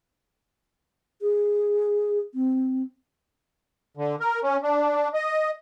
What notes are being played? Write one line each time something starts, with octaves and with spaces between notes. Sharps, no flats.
G#4
C4
D3
A#4
C#4
D4
D#5